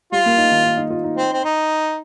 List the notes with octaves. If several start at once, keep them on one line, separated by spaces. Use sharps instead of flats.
G3 F4
A#3
D#4
D#3
D#4
D#4
F4
D#4
C4
C4
D#4